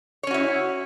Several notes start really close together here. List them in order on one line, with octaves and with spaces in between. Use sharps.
C#5 C#4 F#4 E4